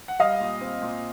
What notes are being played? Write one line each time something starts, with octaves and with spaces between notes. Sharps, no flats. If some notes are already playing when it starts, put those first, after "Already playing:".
F#5
G3 D#5 F5
A#2
C4
A#2